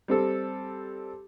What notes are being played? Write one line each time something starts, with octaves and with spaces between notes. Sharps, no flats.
G3 C4 A4